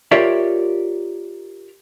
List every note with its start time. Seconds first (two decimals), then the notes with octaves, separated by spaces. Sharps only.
0.11 F4 G4 A#4 C#5 D5 E5